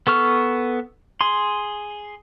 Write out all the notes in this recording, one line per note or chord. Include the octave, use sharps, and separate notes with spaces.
B3 A4 C#6 F6
G#4 C6